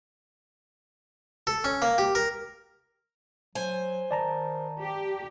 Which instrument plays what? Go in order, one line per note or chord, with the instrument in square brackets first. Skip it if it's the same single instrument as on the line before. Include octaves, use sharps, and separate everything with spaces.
[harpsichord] A4
C#4
A#3
G4
A#4
[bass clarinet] F#3 [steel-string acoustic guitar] C5 G#5
[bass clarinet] D#3 [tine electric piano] D5 A5 A#5
[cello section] G4